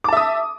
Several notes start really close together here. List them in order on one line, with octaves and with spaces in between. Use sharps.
D6 A5 E5 D#6